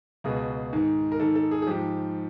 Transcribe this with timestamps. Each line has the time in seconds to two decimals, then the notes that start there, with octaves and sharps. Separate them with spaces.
0.24 C#2 B2 G#4
0.73 G#2 D#3
1.12 A#4
1.20 G#2 D#3 A4
1.36 A4
1.51 G#4
1.62 G#4
1.67 G#2 F3 G4